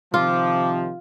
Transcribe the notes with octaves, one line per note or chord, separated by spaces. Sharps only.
C3 D#3 F3 F4 D6